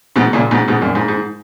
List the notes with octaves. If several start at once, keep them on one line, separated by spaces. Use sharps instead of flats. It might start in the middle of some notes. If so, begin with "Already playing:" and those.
G#2 B2
A#2 C#3
G#2 B2
G#2 B2
F#2 A#2
G#2
G#2